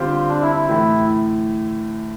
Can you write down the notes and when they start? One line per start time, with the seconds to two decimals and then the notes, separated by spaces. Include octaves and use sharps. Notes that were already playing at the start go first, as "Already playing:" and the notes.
Already playing: D3 G3 C4 F4 G4 C5
0.29 D4
0.42 E4
0.55 E4
0.69 A2 E3 A3